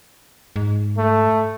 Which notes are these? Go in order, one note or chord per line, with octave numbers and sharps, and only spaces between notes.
G#2
A3